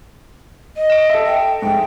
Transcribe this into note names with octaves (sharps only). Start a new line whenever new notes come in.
D#5
D7 E7
A4 E5
G5
G#2 G#3 G5